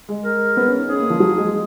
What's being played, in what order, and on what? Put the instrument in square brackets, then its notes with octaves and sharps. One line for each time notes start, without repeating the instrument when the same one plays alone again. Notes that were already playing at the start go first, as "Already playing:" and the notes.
[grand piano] G#3
[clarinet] A#4
[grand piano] B3
C#4
D#4
[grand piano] C#4 [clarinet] G#4
[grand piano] A#3
F3
F#3
G#3